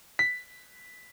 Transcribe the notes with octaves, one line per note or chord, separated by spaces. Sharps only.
B6